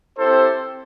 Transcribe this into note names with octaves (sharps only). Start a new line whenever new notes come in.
C4 E4 G4 A4 C5